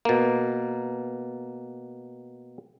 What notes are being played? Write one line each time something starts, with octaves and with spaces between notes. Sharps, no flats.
B2 A#3